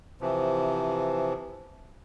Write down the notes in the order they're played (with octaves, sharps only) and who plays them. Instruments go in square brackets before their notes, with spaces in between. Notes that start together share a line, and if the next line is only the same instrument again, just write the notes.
[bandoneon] C3 E3 F3